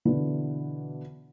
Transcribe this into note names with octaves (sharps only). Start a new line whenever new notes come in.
B2 D3 E3